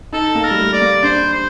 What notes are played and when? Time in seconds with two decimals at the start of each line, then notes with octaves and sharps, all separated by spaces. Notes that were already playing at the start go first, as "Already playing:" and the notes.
0.13 D#4 A4
0.35 A#3
0.44 A#4
0.51 G3
0.58 A3
0.73 D5
0.81 A#3
1.03 D4 C5
1.33 C5